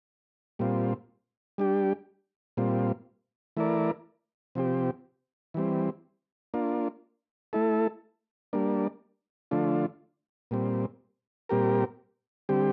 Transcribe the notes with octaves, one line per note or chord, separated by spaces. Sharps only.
A#2 G3 C4 F4
G3 D4 G4
A#2 G3 C4 F4
E3 A3 E4 A#4 D5
C3 F3 C4 G4
E3 G3 C4
A#3 D4 F4
A3 E4 A4
G3 A#3 D4
D3 F3 A3 D4 F4
A#2 G3 C4
A#2 G3 C4 G4 A#4
D3 G3 C4 G4